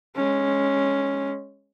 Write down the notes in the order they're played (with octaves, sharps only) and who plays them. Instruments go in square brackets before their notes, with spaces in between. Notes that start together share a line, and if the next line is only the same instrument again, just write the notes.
[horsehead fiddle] G#3 C#4